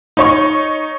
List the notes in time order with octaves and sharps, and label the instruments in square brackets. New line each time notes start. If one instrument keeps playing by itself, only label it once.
[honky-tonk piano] D#4 C#5 C#6